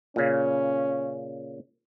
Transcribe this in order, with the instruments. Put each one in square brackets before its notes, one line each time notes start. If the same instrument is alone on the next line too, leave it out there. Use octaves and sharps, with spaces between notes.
[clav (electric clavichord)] A#2 C#3 [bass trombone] C#4